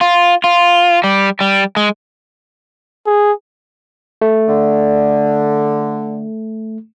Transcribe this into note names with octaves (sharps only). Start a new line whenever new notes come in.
F4
F4
G3
G3
G#3
G#4
A3
D3